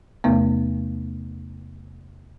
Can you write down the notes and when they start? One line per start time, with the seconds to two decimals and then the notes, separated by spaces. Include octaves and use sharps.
0.24 E2 C3 A3 B3